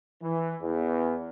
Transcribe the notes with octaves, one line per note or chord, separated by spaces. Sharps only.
E3
E2